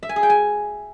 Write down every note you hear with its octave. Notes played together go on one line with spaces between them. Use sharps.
E5
G#5
G#4
G5
G#5